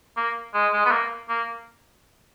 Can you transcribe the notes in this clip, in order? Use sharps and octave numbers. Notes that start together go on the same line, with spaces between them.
A#3
G#3
G#3
B3
A#3
A#3